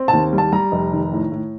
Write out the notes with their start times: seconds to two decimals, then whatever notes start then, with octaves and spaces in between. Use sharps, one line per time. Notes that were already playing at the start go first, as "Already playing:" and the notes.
Already playing: C4
0.08 A5
0.13 D#2
0.33 G3
0.38 A5
0.52 G3 A#5
0.72 F1
0.93 D#3
1.12 A2
1.32 A2